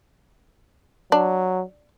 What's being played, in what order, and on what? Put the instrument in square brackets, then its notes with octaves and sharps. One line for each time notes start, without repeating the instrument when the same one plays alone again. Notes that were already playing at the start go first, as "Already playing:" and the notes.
[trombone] F#3 [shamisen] D4